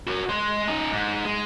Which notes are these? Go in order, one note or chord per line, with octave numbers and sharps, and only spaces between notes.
F#4 A#4
G#3 C6
C#4 D#4
G#2
G#3